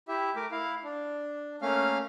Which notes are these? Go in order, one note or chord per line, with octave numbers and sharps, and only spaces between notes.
E4 G4 E5
A3 A#4 D6
E4 F5
D4
A3 A#3 C#4 F5 F6